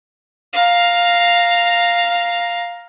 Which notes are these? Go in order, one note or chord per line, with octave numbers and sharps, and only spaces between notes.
F5 A#5